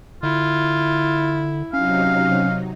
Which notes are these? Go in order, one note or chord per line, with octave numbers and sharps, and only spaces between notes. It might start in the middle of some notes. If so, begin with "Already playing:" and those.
D3 E4 F4
C3 F#3 C#4 D#4 F5